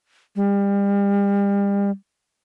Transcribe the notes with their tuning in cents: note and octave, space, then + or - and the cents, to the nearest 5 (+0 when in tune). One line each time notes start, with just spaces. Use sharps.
G3 +35